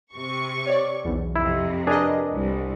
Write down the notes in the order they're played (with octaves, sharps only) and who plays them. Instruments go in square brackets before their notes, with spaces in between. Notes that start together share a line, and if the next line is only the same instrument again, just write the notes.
[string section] C3 C#6
[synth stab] C#5 D5
B1 E2
[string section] F2 C3 [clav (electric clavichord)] E4
[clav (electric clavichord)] D4 G#4 [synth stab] A#4 B4 D#5
[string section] C2